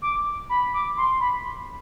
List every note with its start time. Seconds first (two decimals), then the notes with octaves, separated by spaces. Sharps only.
0.02 D6
0.49 B5
0.74 D6
0.97 C6
1.20 B5